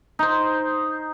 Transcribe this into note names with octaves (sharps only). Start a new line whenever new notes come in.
D#4 C5